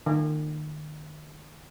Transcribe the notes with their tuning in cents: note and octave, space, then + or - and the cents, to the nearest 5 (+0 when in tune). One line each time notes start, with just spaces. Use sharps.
D#3 -40